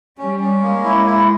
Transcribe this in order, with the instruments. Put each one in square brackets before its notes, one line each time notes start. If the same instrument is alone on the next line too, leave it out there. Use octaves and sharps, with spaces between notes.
[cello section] G3 [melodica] C#4
[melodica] C#4
[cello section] G#3 [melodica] A#3
[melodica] E4
E4